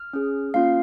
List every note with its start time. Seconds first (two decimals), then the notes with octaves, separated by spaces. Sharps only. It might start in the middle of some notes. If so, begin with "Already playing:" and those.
Already playing: F6
0.13 C#4 G#4
0.54 A#3 C#4 F4 F5